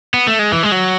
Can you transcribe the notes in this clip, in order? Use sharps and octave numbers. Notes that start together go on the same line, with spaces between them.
B3
A3
G#3
E3
G#3
F#3